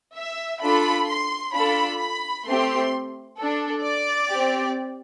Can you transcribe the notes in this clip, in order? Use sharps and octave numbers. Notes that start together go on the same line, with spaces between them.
E5
D4 F4 A4 B5
C6
D4 F4 A4 B5
B5
A3 C4 G4 C6
D4 A4
D5
C4 G4